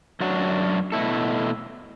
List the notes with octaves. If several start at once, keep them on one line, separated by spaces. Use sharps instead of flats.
F#2 F#3 D4 F#4
B2 A3 E4 A4